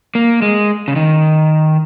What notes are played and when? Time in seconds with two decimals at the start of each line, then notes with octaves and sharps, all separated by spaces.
0.15 A#3
0.42 G#3
0.88 C#3
0.96 D#3